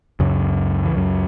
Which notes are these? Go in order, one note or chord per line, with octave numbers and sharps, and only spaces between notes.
C#2 F#2 C#3 F#3
E3
F#2 F#3